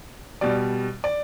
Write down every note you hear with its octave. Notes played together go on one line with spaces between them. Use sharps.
B2 G3 D5
D5